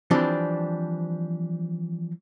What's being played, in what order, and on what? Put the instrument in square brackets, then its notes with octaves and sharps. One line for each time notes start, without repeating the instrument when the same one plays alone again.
[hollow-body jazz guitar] E3 F3 G3 C4 D4